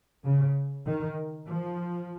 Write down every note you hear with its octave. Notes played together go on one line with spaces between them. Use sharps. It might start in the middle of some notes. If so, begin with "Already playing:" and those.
C#3
D#3
F3